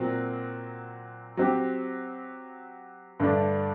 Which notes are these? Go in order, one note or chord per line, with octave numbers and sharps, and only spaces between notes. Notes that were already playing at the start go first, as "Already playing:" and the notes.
Already playing: A#2 F#3 C4
F#3 C4 G4
G2 D3 A3 D4